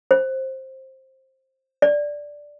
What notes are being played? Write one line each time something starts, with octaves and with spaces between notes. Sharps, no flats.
C5
D5